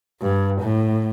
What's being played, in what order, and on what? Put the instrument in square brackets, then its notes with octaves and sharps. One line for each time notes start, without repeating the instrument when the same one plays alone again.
[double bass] G2
A2